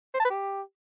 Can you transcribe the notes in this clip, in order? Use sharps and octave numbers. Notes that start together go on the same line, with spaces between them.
C5
A5
B4
G4